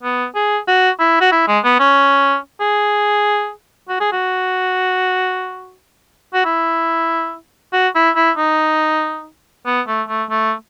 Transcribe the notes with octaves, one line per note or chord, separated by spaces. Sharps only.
B3
G#4
F#4
E4
F#4
E4
G#3
B3
C#4
G#4
F#4
G#4
F#4
F#4
E4
F#4
E4
E4
D#4
B3
A3
A3
A3